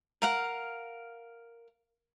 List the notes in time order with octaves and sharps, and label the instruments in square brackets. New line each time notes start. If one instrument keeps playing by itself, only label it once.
[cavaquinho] A#4 F5 F#5